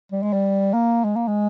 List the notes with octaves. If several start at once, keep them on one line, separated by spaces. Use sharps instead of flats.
G3
G#3
G3
A#3
G#3
A#3
G#3